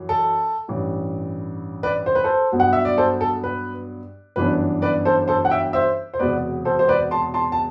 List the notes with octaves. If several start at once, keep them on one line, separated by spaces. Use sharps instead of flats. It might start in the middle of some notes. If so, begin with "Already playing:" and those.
Already playing: F#2 E3
A4
A1 G2 E3
B4 D5
C5
B4
A4 C5
G2 F#3 B3
F#5
E5
D5
A4 C5
A4
B4
G1 F#2 E3 B3 D4 B4
B4 D5
A4 C5
A4 C5
F#5
E5 G5
C5 E5
C5
E1 E2 C3 F#3 B3 B4 D5
A4 C5
C5
B4 D5
A5 C6
A5 C6
A5